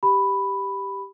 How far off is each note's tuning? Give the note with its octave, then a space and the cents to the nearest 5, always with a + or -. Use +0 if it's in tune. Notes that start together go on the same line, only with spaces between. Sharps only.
G4 +0 B5 +5